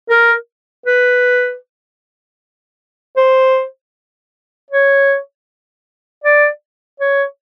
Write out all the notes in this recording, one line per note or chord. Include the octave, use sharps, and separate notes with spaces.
A#4
B4
C5
C#5
D5
C#5